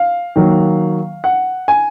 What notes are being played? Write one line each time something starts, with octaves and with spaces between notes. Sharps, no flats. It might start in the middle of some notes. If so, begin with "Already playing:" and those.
Already playing: F5
D#3 F#3 A#3
F#5
G#5